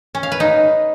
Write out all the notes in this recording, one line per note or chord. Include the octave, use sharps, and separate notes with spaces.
C#4
F5
B4
D#4